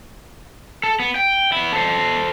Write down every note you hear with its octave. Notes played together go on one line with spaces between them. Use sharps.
A4
B3
G5
B3 E4
A4 C5